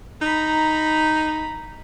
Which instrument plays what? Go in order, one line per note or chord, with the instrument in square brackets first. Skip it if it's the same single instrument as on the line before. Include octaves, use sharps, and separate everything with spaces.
[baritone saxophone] D#4 [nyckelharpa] A#5 B5